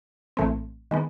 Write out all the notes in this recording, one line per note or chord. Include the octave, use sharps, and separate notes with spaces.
A#1 A2 E3 A3 C4
D#3 G#3 B3